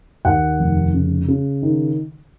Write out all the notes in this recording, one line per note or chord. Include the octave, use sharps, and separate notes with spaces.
D#2 F#5
F1
C#3
C#3
D#3